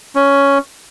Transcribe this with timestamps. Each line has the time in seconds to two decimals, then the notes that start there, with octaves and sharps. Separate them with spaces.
0.15 C#4